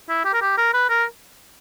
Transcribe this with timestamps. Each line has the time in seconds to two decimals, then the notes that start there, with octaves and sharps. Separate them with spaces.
0.09 E4
0.25 G4
0.34 A#4
0.42 G4
0.58 A#4
0.74 B4
0.90 A#4